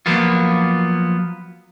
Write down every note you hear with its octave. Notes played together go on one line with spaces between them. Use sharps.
F3 F#3 A#3 B3 F4